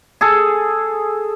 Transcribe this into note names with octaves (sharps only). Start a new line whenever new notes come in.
G#4 A4